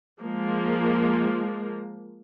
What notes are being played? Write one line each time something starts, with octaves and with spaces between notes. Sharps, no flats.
F3 G#3 A#3